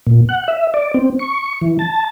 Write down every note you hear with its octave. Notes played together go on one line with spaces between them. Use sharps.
A#2
F#5
E5
D5
C4
C#6
E3
A5